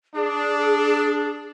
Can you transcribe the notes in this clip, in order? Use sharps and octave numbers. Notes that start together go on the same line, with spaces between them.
D4 G#4